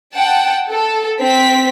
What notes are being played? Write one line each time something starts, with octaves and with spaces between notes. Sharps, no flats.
F#5 G5 A5
A4
C4 B6